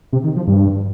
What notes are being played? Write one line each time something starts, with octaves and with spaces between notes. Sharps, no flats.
C3
D#3
F3
G2